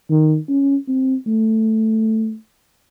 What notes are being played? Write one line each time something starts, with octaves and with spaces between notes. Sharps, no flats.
D#3
C#4
C4
A3